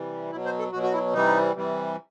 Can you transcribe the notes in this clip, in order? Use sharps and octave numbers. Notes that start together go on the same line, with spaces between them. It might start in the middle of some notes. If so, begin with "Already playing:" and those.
Already playing: C3 E3 G3
B2 F#3 E4
C5
A4
B2 F#3 F#4
F#4
E4
C3 E3 G3 D#4
C3 E3 G3